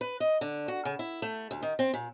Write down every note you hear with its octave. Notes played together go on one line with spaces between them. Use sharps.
B4
D#5
D3
F#4
C#3
E4
A3
D2
D#3
C4
A#2